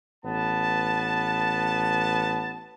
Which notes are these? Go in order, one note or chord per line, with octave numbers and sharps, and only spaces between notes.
A1 B3 A5